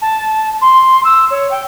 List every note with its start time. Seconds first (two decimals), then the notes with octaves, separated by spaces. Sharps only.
0.02 A5
0.61 C6
1.05 E6
1.30 C#5
1.51 G5